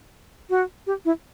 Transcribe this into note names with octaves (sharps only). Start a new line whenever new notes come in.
F#4
G4
E4